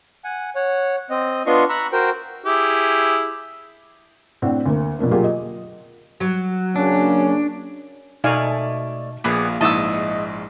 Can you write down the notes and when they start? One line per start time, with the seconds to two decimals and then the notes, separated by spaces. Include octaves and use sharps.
0.24 F#5 G#5
0.55 C#5 F#5
1.10 C4 D#5
1.46 B3 D4 F4 D#5 C6 C#6
1.69 A#5 B5 C#6 E6 F#6
1.93 F#4 A#4 C5 G5
2.45 E4 G4 G#4
4.42 A2 C4 D4 F#5
4.66 D2 A#3
4.99 B2 F3 A#3 D4
5.11 A#2 F#3 A#3 F4 G4 G#4
5.24 D#5
6.20 F#3
6.76 C#3 A#3 C#4 D4
8.24 B2 A3 D#4 D5 F5 G#5
9.24 A#1 A#2 A#3 B3 G#4 D6
9.61 A#1 G#2 D#4 E4 D#5 A5 C#6 E6